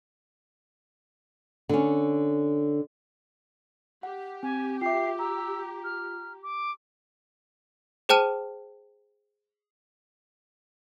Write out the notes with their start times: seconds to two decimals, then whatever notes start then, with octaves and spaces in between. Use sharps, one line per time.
1.69 D3 C#4
4.03 G4 F#5
4.43 C4 G#5
4.81 F4 E5 G5 D6 C7
5.19 A#5 E6
5.84 F6
6.43 D6
8.09 G#4 C5 G5 A5 F6 D#7